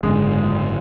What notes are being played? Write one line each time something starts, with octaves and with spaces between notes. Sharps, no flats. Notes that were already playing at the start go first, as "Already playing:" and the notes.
F#1 G#2 D3 G#3